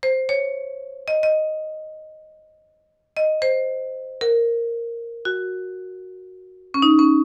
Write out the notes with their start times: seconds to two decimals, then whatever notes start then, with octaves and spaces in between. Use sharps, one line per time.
0.03 C5
0.29 C#5
1.08 D#5
1.23 D#5
3.17 D#5
3.42 C5
4.21 A#4
5.25 F#4
6.74 C#4
6.82 D#4
6.99 C#4